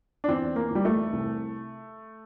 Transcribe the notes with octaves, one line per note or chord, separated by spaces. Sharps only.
D4
E2 C4
A#3
E2 G3
A3
C2